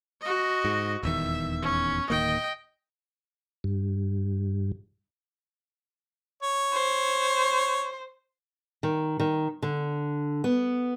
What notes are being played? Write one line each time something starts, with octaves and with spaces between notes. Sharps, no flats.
F#4 D#5
G#2
D#1 E2 D#3 E5
C#4
D1 D#3 A#3 D#5 G5
G2
C#5
C5
D#3
D#3
D3
B3